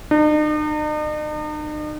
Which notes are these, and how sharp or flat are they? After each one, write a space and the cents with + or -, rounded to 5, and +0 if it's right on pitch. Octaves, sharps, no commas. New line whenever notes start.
D#4 -45